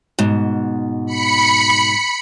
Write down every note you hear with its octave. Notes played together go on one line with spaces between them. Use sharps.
G#2 B2
B5 C#7